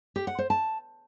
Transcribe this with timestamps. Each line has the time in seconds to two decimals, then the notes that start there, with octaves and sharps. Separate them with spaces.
0.16 G4
0.27 F#5
0.39 C5
0.50 A5